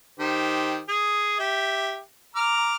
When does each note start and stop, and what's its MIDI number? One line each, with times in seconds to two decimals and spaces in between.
0.19 0.80 51
0.19 0.80 67
0.19 0.80 72
0.89 1.38 68
1.39 1.98 67
1.39 1.98 76
2.36 2.76 82
2.36 2.76 86
2.36 2.76 89